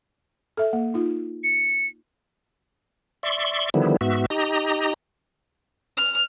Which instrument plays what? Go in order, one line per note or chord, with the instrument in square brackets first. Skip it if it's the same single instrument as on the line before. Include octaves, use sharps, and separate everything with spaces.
[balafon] A4 E5
A#3
D#4 F4
[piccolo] C#7
[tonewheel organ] D5 E5 C6 C#6
D3 D#3 F3 G3 B3 E4
G#2 B3 F#4 E5
D#4 G4 D#5 A#5
[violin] F6